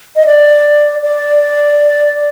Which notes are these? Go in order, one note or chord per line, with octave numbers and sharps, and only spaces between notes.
D#5
D5
D5